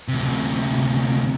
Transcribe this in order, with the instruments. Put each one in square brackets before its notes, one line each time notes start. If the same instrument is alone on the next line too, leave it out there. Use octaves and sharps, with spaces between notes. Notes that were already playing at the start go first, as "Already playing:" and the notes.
[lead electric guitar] D2 C3